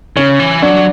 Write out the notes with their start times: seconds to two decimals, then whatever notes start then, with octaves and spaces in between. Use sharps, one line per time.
0.17 C#3 C#4
0.39 E3
0.62 F#3 D4